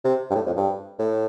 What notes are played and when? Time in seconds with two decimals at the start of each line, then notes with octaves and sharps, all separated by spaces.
0.05 C3
0.30 G2
0.35 A2
0.47 F2
0.56 G2
0.99 A2